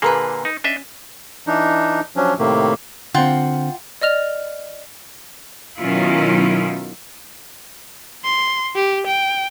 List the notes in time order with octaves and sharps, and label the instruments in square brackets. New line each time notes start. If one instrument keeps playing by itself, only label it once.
[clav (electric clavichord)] A#2 D3 A#3 [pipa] G#4 A#4 B4
[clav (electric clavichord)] D#4
[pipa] C#4 [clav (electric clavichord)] D4 D#5 E5
[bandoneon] E3 D4 D#4
F3 F#3 C#4 D4
A2 C3 D#3 A3 A#3
[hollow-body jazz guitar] D3 C4 [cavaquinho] F4 F#5 G5
[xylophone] D5 D#5 F6 F7
[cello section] B2 D#3 F#3 C#4 E4 F4
[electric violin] C6
G4
G5